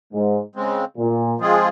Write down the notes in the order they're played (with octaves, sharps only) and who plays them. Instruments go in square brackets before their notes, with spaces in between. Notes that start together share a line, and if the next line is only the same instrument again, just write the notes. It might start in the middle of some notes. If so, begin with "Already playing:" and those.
[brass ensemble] G#2
[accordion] C#3 G#3 C4
[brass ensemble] A#2
[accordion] F3 G#3 C4 F4 G#4